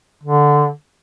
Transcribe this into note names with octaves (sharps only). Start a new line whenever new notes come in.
D3